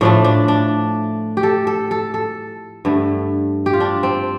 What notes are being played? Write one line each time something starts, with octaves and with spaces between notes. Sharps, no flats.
A2 F3 A3 D4
D4
D4
G4
A4
A4
A4
A4
G2 D3 A3
G4
F4
D4
C4